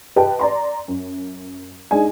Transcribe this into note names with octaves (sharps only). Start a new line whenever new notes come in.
G4 B4 D#5 G5 A5
D5 A#5 C6
F#2
G#3 D4 D#4 G#5